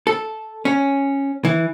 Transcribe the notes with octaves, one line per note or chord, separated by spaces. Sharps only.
A4
C#4
E3